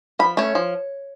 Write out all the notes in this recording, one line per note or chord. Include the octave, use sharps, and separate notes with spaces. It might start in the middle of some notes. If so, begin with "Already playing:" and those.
F3 B5
A3 C#4 C#5
F3